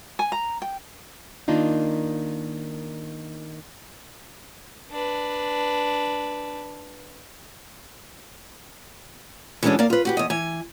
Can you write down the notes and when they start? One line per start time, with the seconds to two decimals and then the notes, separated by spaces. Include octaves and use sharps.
0.19 G#5
0.32 A#5
0.62 G5
1.48 D#3 A#3 D4 D#4 F4
4.91 D4 B4
9.63 E3 F#3 G#3 C#4 D4 A4
9.79 A#3 A#4 D5 F5
9.90 F4 B4
10.05 F#4 G4 B4
10.17 E2 D#5
10.30 E3 G#5